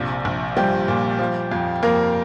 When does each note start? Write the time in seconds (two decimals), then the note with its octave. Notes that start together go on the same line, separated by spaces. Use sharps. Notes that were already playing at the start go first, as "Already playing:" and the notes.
Already playing: A#1 C3 F3
0.25 A#1
0.57 F3 G3 G4
0.88 A#2
1.19 F3
1.52 F2
1.83 F2 A#3 A#4